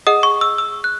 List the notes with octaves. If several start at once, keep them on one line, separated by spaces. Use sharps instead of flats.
G#4 D#5 F#5 D#6
C#6
E6
E6
F#6